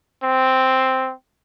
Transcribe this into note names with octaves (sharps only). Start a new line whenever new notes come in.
C4